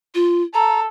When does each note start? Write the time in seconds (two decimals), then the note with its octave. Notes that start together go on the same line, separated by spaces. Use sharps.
0.15 F4
0.54 A4 A#5